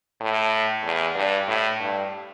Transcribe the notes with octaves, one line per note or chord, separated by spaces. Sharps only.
A2
E2
G2
A2
G2